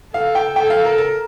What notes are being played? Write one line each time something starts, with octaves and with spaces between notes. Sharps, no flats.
A4 F5
G5
A4 G5
F5
A#4
A#4